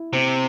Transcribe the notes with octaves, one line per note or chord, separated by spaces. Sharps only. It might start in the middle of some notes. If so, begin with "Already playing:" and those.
Already playing: E4
C3 C4